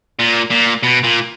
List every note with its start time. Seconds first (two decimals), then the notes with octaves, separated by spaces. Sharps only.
0.19 A#2
0.51 A#2
0.83 B2
1.03 A#2